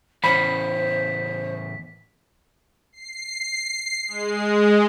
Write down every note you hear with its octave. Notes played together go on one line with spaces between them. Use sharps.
E2 A2 C#4 C5 B5 B6
C7
G#3